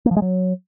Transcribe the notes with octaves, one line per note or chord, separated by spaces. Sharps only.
A#3
F3
G#3
F#3